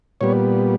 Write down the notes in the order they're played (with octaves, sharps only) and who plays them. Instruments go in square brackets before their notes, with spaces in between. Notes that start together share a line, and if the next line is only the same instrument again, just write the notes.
[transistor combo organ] A#2 G3 B3 C#5